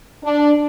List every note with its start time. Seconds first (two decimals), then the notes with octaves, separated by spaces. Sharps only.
0.23 D4